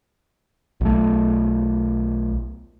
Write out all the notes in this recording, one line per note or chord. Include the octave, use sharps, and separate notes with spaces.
B1 A3